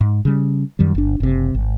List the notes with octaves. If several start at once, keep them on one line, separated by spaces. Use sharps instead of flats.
G#2
C#3 G3
F#2 D#3 G3
G1 D4
F#1 C3
G#1